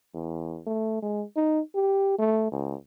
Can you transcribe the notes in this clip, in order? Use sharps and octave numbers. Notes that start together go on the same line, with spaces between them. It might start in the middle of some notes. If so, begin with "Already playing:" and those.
E2
A3
G#3
D#4
G4
A3
C#2